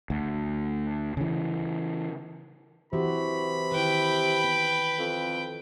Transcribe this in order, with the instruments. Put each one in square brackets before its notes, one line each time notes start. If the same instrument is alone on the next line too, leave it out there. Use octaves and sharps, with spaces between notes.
[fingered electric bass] D2
C#3 E3
[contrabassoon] C3 [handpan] E3 F#4 [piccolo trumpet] B5
[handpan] D#3 E4 [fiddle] B4 G5
[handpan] B3
[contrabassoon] F2